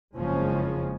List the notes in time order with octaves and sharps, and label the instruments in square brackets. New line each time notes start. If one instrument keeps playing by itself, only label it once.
[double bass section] F#1 F2 C#3 F3 G#3 C#4